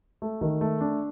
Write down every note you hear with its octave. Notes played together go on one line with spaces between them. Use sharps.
A3
D#3
A3
D4